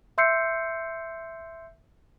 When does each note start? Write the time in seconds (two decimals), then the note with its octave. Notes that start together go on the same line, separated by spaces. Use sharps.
0.18 E5 C6 E6 G6 C7 C#7